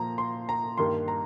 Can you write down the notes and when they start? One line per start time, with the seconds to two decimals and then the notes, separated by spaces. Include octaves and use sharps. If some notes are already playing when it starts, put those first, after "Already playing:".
Already playing: A#2 F3 A#3 A#5
0.18 C6
0.49 A#5
0.78 G2 D#3 G3 A#3 C6
1.08 A#5